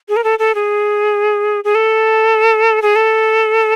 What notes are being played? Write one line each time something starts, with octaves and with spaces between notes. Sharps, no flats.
G#4
A#4
A4
A4
G#4
G#4
A4
G#4
A4